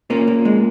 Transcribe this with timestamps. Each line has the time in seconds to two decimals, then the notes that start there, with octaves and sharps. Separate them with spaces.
0.10 A#2 A#3 C#4
0.27 A#2
0.45 G#3